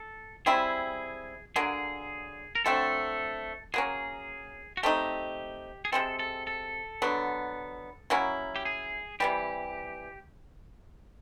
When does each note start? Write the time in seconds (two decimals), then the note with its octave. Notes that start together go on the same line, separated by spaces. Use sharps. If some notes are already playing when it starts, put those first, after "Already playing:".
Already playing: A4
0.46 G3 C4 E4 G#4
1.56 D3 F#3 A#3 G#4
2.55 A#4
2.65 D3 F#3 A3 C4 A4
3.74 F#3 A#3 C#4 G#4
4.77 F#4
4.83 A3 C4 D#4 G4
5.85 G#4
5.92 C3 E3 G#3 C4 A4
6.19 A4
6.47 A4
7.02 D3 F#3 B3
8.10 F#3 A#3 C#4 E4
8.56 G4
8.65 G#4
9.20 C3 E3 G3 G4